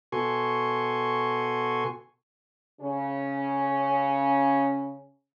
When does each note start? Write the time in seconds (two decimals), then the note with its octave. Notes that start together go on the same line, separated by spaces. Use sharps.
0.12 B2 F#4 A4 G#5 C6 C#6
2.80 C#3 C#4